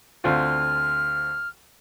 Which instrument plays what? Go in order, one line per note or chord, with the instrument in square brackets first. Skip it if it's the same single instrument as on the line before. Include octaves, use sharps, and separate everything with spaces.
[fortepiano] D2 C4 F4 [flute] F6